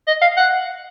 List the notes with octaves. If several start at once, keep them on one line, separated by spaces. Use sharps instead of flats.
D#5
F5
F#5